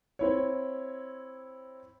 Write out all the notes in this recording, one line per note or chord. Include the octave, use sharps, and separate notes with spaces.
C4 E4 C#5